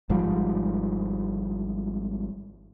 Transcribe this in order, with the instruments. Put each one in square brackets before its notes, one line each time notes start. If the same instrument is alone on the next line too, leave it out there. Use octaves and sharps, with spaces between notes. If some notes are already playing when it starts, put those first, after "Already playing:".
[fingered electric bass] G#1 G#2 F3 G3